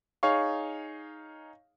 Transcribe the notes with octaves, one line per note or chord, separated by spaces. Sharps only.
D#4 G#4 C#5 F5 C#6